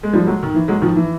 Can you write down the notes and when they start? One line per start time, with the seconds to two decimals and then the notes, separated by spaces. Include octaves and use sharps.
0.03 G#3
0.13 F3 G3
0.27 F#3 G#3
0.43 D#3
0.55 E3
0.68 F#3 G#3
0.82 D#3 F3
0.96 E3